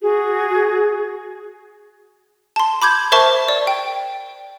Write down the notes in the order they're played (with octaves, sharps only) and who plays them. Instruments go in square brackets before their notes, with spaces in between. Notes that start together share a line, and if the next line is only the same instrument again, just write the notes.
[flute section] F#4 G#4
[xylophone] A5 C6
B5 D6 G6 G#6
A#4 C5 E5 A5 C#6
D5
G5